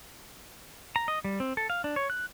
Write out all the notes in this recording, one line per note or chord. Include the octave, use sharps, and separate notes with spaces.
A#5
D#5
G3
C4
A4
F5
D4
C#5
F#6